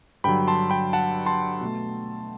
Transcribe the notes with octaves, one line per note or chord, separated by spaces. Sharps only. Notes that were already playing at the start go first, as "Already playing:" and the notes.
G2 D3 F#3 G5 B5
A5 C6
G5 B5
F#5 A5
A5 C6
B2 A3